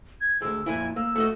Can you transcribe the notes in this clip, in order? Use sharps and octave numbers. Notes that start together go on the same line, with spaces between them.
G#6
D2 G#3 E6
F2 A#2 E4 G#5
A#3 E6
A3 F#4 D#5